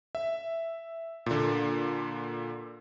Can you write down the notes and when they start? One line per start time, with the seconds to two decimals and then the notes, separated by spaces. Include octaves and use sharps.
0.15 E5
1.26 A#2 D3